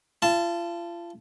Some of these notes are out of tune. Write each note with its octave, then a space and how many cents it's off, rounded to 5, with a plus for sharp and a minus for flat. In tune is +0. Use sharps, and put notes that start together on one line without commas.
F4 -35 A5 +0